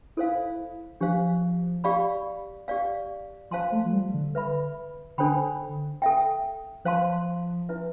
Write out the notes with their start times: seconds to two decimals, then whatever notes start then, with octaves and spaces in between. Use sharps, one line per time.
0.17 E4 A4 C5 F5
1.01 F3 D4 G4 C5 F5
1.84 G4 D5 F5 B5
2.68 G4 D5 F5
3.51 F3 C5 F5 A5 C6
3.72 A3
3.86 F3
3.93 G3
4.14 D3
4.35 B4 E5 B5
5.18 D3 D4 A4 C5 G5 B5
6.02 A4 E5 G5
6.85 F3 C5 F5 A5 C6
7.69 E4 B4 E5